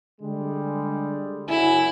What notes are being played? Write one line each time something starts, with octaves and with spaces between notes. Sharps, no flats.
D3 G3 G#3
F#1 F#3 E4 G#5